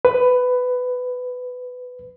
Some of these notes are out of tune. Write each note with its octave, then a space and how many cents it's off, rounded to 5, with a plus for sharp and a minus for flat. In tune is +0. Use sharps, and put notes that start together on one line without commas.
B4 +15